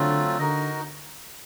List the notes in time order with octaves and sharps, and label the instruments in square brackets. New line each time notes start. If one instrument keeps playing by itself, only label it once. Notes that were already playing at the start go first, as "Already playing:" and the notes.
Already playing: [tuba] D3 [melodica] F#3 A3 C4 F4
[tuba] D3 [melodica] D#4 F#4 A#4 D#5